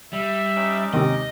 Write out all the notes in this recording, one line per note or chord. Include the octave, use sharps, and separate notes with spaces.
G3 E5
C#4 D#4 D6
D#2 G#2 C3 D#5